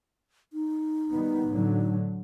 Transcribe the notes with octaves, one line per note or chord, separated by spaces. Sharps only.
D#4
D#3 G3 B3
A2 D3 F#3